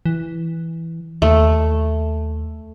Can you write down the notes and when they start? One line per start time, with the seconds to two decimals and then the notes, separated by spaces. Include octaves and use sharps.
0.06 E3
1.22 D#2 A3